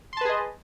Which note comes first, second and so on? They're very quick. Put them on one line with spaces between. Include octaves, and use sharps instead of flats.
C6 A5 B4 G#4 D#5